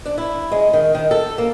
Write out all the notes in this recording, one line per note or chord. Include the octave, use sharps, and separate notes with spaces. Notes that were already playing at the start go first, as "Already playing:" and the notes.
D4
E4
G#3
D#3
D#3
A4
A#3